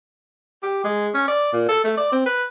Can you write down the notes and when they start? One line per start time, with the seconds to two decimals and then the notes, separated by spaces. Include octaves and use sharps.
0.63 G4
0.84 G#3
1.14 C#4
1.28 D5
1.53 A#2
1.69 A4
1.84 A3
1.97 D5
2.12 C4
2.26 B4